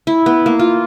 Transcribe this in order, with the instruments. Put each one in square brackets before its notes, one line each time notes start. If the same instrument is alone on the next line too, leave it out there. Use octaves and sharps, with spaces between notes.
[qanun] E4
B3
A#3
F4